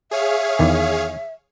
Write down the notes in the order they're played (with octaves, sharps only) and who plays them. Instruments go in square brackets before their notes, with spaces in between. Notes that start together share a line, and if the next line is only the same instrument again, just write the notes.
[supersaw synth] G#4 C#5 F5 [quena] E5
[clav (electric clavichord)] E2 D#3